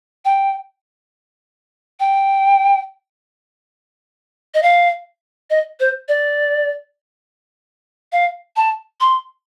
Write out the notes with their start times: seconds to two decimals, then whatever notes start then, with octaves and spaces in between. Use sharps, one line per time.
0.25 G5
2.00 G5
4.54 D#5
4.63 F5
5.50 D#5
5.80 C5
6.08 D5
8.12 F5
8.56 A5
9.00 C6